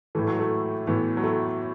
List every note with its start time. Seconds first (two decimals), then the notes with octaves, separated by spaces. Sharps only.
0.15 A2 E3 A3
0.27 F#3
0.39 A3
0.87 A2 E3 B3
1.17 F#3
1.24 A3